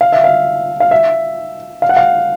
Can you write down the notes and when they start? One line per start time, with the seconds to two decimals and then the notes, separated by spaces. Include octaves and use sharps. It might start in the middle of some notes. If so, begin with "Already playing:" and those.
0.01 F5
0.12 E5
0.24 F5
0.80 F5
0.91 E5
1.82 F5
1.89 F#5
1.97 F5